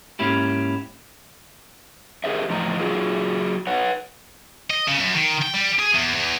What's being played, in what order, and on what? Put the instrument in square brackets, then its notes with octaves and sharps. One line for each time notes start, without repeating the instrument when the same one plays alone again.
[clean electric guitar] G#2 A#3 C#4 E4 G4
[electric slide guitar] G4 G#4 A#4 C5 D#5 E5
E2 A2 F3 D#5 A#5
F#3 F4 G#4
B4 C#5 F#5
[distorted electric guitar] D#5
C#3
F#2
D#3
G5
G3
G#4
E2
E2